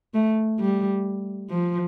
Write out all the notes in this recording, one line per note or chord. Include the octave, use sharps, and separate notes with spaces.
A3
G3
F3